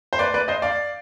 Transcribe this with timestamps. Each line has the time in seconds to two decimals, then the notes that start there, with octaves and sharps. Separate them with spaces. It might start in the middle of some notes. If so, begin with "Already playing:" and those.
0.13 C5
0.19 B4 D5
0.34 B4 D5
0.48 C5 D#5
0.62 D5 F5